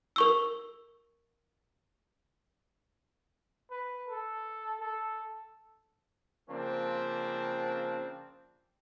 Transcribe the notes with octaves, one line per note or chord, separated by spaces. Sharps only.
A#4 C#6 E6
B4
A4
A4
C#3 F3 A#3 C4 D4